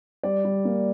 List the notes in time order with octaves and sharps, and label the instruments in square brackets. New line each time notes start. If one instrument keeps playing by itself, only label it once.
[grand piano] G3 D5
G3
A#3